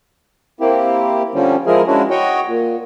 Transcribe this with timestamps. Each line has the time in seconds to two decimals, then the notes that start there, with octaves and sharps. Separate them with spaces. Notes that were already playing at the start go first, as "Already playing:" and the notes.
0.61 A#3 C4 E4 G4
1.35 D3 F3 G3 C4 C#4
1.67 F3 G#3 E4 G#4 A#4
1.87 G#3 C#4 D4 E4 F#4
2.11 F#4 C#5 D#5 G5
2.46 A#2